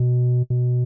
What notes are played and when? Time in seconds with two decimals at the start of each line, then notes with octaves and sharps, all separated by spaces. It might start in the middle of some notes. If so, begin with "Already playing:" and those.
Already playing: B2
0.50 B2